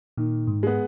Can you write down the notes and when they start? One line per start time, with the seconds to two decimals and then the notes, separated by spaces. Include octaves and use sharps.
0.17 A#2 D#3
0.47 G#2
0.63 G#3 B3